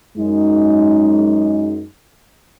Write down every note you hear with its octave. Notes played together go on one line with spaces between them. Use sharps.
F#2 G#3 D#4